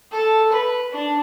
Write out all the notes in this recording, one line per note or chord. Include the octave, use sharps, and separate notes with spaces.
A4
B4
D4